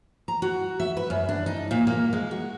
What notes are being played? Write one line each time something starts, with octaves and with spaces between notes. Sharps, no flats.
A#5
F#4
E5
B4
F#2
D4
D#4
A#2
A#3
G#3
F#4